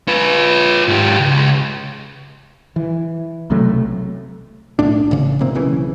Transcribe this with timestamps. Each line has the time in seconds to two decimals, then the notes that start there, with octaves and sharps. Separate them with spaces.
0.08 F4 B4
0.88 G#2 G4
1.20 C#2
2.76 E3
3.50 B1 C3 F#3 A3
4.79 B1 A2 D4
5.11 A1 C#3
5.41 C3 E3 A#3 C4
5.55 B1 C#3 E3